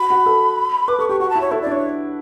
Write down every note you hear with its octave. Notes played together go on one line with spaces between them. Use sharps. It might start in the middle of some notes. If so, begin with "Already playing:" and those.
Already playing: F#4 B5
F#4
A4
B4 D6
A4 C#6
G4 C#6
F#4 C#6
A5
E4
C#5
E4 A4
D4 D5
C#5